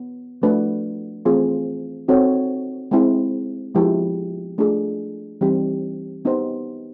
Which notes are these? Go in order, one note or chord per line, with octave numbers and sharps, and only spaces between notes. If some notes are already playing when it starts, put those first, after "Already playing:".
Already playing: B3
F3 A3 D4 F#4 B4
E3 A3 C4 F4 G#4
C4 D#4 F#4 A4 C#5
G#3 C4 E4
F3 G#3 B3 E4 G4
A3 D4 F4 G#4
E3 G3 C4 D#4 G4
B3 D#4 G4 C5